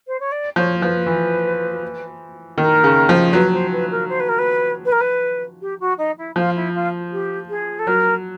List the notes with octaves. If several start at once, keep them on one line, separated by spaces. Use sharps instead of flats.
C5
C#5
D5
F3 C#5
F3 B4
E3
D#3 A#4
C#3
F3
F#3 B4
C5
B4
A#4
C5
B4
A#4
B4
B4
A#4
B4
G4
F#4
D#4
E4
F3 F4
E4
F4
G4
G#4
A4
F#3 A#4